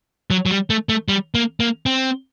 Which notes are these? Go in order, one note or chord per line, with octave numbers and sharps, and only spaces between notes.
F#3
F#3
G3
A3
A3
G3
A#3
A#3
C4